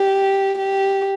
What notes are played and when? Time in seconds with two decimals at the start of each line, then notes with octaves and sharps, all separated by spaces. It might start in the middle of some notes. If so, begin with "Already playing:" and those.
Already playing: G4
0.59 G4